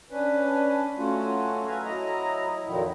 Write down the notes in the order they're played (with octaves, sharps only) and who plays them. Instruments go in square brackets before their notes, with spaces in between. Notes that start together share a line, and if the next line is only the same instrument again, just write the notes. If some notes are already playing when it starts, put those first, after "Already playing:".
[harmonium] C#4 D4 B4
F#3 A3 C#4 F4 F#4
A4 B4 F5 G#5 A#5
F#3 E4 D#5 A#5
F2 A#2 D#3 F3 F#3 E4